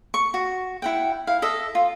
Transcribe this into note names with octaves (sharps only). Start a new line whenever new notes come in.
C#6
F#4
E4 F#5 G5
E4 F5
A4 D#5 E5
F4